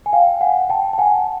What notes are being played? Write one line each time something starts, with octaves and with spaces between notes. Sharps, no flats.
G#5
F5 G5
F#5 G#5
G5 A5
A5
F#5 G#5